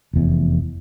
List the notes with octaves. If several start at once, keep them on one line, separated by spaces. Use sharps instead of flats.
F1 E2